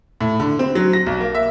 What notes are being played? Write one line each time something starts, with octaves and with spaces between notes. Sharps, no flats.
A2
D3
C4
F#3
A#6
B1
A#3
E5